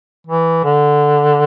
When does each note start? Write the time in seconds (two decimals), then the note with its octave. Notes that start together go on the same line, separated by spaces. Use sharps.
0.27 E3
0.64 D3